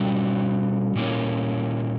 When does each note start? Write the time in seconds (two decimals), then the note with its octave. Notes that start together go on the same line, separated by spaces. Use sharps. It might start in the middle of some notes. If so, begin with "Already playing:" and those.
Already playing: B2 G3 C#4 F#4
0.95 A#2 G3 A#3 C#4 E4